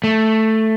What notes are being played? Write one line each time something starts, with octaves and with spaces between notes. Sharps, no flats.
A3